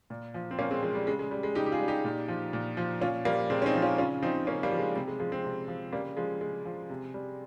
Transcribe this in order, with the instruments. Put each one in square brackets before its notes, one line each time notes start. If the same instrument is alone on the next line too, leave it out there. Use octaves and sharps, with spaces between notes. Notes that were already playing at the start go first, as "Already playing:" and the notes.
[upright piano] A#2
F3
C4
A#2 A#3 C#4
G#3 C4
F3 G#3
G3
C#3 G#3
G#3
G3
G#3
C#3 D#4 G4
G4
F4 G#4
G3
D#4 G4
A#2
F3
A#2
F3
A#2 C#4 F4
F3 G3 A#3
A#2 G#3 C4
C#4
C4 D#4
F3
C#4 F4
C#3 C#4 F4
F3 C4 D#4
C#3 A#3 C#4
G3 A#3
F3
G#3
C3 G3
G#3
F3 G#3
G#3 C4
C3
F3
C#3 G3 A#3
F3 G#3
C#3 G#3
F3
C3
G3